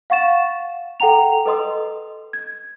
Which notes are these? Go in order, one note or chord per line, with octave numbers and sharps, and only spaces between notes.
F5 F#5 C#6 A6 E7
A4 F#5 G5 A#5 F7
A4 B4 D#5 C6 D#6
G#6